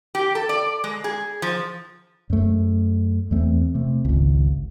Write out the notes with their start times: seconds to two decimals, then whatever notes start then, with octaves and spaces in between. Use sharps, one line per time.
0.15 G4
0.35 A4
0.49 D5
0.84 G#3
1.04 G#4
1.42 F3
2.30 F#2 A3
3.31 E2 A3 C4
3.75 C3 A3
4.05 G#1 C#2